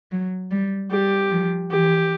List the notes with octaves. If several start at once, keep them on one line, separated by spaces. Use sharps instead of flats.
F#3
G3
G3 G4
F3
E3 G4